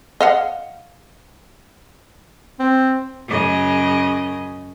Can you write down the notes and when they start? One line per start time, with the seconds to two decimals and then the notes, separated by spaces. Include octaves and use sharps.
0.21 D#5 F5 F#5
2.59 C4
3.27 F#2 C#3 D#5